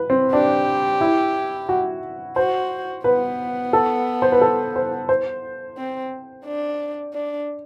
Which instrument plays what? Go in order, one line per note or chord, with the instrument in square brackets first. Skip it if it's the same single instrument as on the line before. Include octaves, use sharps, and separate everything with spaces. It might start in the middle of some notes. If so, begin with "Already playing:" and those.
Already playing: [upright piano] B4
C4
[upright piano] D4 [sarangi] G4
[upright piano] E4
F#4
[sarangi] F#4 [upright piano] C5
[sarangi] B3 [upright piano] B4
[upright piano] A4
C5
B4
A4
C5
C5
[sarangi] C4
D4
D4